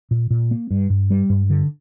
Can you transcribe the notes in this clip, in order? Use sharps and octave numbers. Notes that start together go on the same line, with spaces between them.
A#2
A#2
A#3
G2
G2
G3
G2
D3